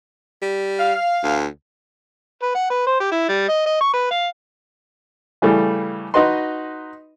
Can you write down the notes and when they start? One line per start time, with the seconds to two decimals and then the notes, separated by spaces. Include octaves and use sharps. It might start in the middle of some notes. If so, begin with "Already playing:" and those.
0.42 G3
0.79 F5
1.23 D2
2.43 B4
2.55 F#5
2.70 B4
2.87 C5
3.00 G4
3.12 E4
3.29 G3
3.49 D#5
3.66 D#5
3.81 C#6
3.94 B4
4.11 F5
5.42 C#3 E3 G3 A3
6.14 D#4 F#4 B4 D#5 C6